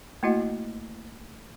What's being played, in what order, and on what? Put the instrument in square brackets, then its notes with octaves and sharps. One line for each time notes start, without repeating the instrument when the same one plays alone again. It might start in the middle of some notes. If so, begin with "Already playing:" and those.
[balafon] A3 A#3 E4 F#4 D#5 F#5